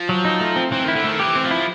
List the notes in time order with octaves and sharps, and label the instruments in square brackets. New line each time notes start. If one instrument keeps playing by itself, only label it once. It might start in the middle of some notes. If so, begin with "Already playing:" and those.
Already playing: [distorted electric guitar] F3
[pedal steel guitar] F#3
D#4
A3
C4
[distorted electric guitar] E3 [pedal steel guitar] C4
[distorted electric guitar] D#3 [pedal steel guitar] E4
[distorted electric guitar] D3
[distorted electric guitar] D#3 [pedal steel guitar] A3
[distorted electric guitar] E3 [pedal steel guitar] G4
[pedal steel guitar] C4
[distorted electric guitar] F3
[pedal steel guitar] E4